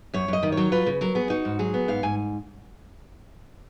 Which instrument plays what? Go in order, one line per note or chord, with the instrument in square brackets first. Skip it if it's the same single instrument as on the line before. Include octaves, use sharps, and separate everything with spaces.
[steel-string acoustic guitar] F#2 C#5
F#2 D#5
D#3
C#5
F#3
F4 B4
C#3
F#3 A#4
B3 G#4
D#4 F#4
G#2
F#3 G#4
B3
G#2 F5
G#2 G#5